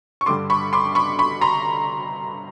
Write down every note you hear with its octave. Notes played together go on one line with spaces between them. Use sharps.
C#6
G2 D3 G3 C6 D6
B5 C#6
C6 D6
B5 C#6
B5 C#6
A#5 C6